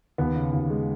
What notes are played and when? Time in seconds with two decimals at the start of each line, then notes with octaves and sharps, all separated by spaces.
0.18 D#2 B3
0.35 C#3
0.53 D#2
0.70 G#3